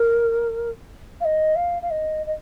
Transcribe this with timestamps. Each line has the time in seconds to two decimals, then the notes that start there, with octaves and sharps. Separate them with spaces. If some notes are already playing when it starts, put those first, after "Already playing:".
Already playing: A#4
1.20 F5
1.24 D#5
1.55 F5
1.82 F5
1.90 D#5
2.26 D#5